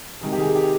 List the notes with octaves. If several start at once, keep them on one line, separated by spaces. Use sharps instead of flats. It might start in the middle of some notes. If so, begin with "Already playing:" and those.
C3 D#3 G#3 G#4
G4
G#4
G4